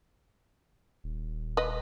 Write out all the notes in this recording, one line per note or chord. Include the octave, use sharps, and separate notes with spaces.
D#1
B4 D#5